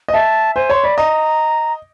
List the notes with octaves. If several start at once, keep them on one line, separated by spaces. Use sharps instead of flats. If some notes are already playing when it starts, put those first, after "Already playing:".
D#5
E5 A5
C5 G#5
C#5 C6
D5 B5
D#5 A#5